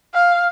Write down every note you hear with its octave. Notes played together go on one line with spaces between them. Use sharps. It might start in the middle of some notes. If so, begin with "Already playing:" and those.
F5